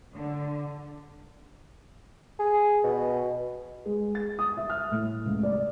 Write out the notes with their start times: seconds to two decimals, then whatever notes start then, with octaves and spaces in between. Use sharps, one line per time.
0.14 D3
2.39 G#4
2.84 B2
3.85 G#3
4.15 A6
4.39 D#6
4.57 E5
4.70 F6
4.91 A2
5.25 C#2
5.43 D5